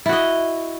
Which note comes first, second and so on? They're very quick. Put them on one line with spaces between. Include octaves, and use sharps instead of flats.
E4 F#4 D#5